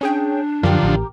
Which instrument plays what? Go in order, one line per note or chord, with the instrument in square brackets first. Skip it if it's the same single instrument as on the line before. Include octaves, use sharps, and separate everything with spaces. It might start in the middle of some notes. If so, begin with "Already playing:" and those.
[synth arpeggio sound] C#4 G#4 G5 [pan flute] D4
[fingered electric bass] F#2 [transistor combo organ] D3 F3 [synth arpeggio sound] G4 A#4
[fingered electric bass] A1